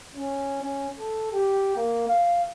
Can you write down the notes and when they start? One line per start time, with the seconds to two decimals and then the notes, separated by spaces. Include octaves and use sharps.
0.16 C#4
0.62 C#4
0.99 A4
1.32 G4
1.76 A#3
2.08 F5